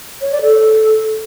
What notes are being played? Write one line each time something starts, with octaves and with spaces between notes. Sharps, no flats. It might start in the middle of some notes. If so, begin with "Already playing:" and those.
C#5
D5
A4